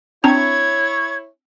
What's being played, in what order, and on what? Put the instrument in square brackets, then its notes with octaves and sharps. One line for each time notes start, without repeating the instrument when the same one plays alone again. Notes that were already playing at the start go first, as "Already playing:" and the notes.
[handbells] C4 D4 A#5 [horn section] E4 C#5 [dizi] G#6